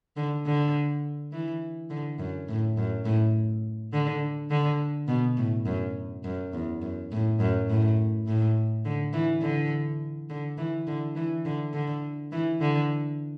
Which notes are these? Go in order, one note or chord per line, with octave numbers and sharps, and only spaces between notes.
D3
D3
E3
D3
F#2
A2
F#2
A2
D3
D3
B2
A2
F#2
F#2
E2
F#2
A2
F#2
A2
A2
D3
E3
D3
D3
E3
D3
E3
D3
D3
E3
D3